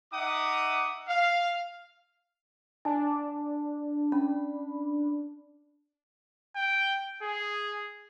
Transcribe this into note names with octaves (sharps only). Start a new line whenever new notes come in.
D#4 E5 F#5 D6 D#6
F5
D4 G#5 A5
C#4 B5
G5
G#4